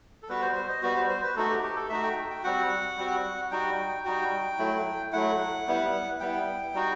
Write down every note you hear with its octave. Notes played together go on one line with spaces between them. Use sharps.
A4
G3 B3 F#4 B4
C5
C5
D#5
G3 B3 F#4
C5
C5
B4
A3 D#4 F#4 A4
G4
G4
A4
A3 D#4 F#4 E5
G5
G5
G3 C4 F#4 F#5
G3 C4 F#4
G3 D#4 F#4 G5
G3 D#4 F#4 G5
F#3 A3 E4
F#3 A3 E4 F#5
G3 B3 E4
G3 B3 E4 G5
G3 D#4 F#4